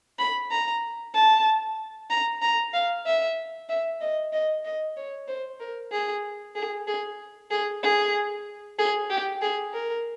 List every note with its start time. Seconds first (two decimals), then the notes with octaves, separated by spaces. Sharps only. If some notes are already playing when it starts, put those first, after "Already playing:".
0.19 B5
0.51 A#5
1.14 A5
2.10 A#5
2.42 A#5
2.74 F5
3.06 E5
3.69 E5
4.01 D#5
4.33 D#5
4.65 D#5
4.96 C#5
5.28 C5
5.60 A#4
5.92 G#4
6.56 G#4
6.87 G#4
7.51 G#4
7.83 G#4
8.78 G#4
9.10 G4
9.42 G#4
9.74 A#4